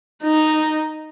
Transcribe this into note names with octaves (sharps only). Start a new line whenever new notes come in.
D#4